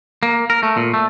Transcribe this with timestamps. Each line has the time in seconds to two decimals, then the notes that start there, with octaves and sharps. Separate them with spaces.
0.23 A#3
0.50 A#4
0.63 A3
0.77 A#2
0.94 A3